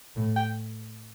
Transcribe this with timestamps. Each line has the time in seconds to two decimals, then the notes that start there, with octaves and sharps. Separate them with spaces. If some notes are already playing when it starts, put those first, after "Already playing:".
0.16 A2
0.36 G5